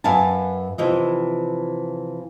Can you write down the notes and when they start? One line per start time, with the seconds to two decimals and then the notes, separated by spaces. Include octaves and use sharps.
0.04 F#2 B4 F5 G#5 A5
0.78 C3 E3 F3 D#5